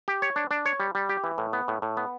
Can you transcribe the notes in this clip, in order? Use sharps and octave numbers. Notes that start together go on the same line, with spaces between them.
G4
C#5
D4
D4
C#5
G3
G3
G4
E3
A2
B3
A2
A2
B3